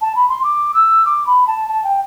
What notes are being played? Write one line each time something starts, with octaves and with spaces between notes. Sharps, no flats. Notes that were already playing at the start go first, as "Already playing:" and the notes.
A5
B5
C6
D6
E6
D6
B5
A5
A5
G5